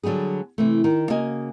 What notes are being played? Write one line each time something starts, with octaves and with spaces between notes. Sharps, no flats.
D3 F#3 G3 B3 G#4
C3 E3 A3
D#3
C#3 A#3 F#4 D#5 G#5